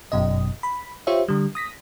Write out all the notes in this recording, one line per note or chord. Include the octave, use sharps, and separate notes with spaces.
G1 F#2 B2 D#5
B5
F4 G4 C5 C#5 E5
D3 G3
D#6 A#6 B6